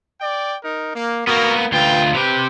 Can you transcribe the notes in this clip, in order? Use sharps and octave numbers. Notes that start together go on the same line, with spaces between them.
D5 G5
D#4 A#4
A#3
A#3 B3 F#4 A#4
D2 F4 B4 G5
C3 C4 G4 B4